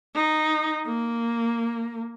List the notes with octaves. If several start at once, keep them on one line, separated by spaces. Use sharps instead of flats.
D#4
A#3